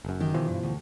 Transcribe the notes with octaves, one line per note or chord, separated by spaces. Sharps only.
F#1 F#2
D#3 G4
B2 E3 F3
G2
D2